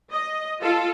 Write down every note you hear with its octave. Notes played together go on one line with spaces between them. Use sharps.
D#5
F4 A4